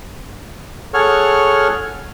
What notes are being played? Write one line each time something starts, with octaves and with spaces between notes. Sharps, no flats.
G#4 A4 C#5 F#5 C#6 F6